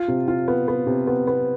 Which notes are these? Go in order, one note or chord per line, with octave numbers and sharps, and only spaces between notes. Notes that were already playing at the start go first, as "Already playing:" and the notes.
Already playing: F4
C3
F4
B3
B3
C3
B3
B3